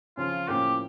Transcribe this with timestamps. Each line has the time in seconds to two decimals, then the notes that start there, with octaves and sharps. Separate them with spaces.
0.17 C#3 F3 C#4 F4
0.48 A2 F3 A#3 C#4 G4